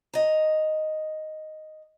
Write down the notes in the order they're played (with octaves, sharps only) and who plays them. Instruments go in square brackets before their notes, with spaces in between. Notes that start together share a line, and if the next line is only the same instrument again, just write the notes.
[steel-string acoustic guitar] D#5 A#5